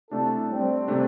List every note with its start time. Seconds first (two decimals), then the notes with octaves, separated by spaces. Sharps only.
0.11 C3 A3 D4 E4 A4
0.50 G3 C4
0.88 C3 A3 D4